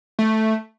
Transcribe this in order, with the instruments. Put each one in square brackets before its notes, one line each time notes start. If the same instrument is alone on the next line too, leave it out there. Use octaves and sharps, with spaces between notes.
[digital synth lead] A3